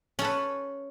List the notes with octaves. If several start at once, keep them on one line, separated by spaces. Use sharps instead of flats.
C#4 A4 B4